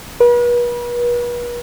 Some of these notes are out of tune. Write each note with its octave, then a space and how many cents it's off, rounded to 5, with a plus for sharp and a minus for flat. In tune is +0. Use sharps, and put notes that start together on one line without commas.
B4 -40